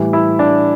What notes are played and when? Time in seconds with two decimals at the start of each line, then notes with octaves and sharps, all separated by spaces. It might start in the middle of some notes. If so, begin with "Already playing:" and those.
Already playing: A2 E3 G3
0.13 E4
0.39 D4